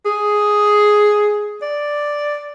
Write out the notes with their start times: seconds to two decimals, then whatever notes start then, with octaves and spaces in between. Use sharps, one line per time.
0.06 G#4
1.62 D5